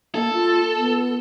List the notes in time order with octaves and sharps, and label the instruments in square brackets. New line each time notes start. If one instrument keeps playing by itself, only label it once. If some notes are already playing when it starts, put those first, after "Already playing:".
[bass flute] A#3 [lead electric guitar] A4
[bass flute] F4
B3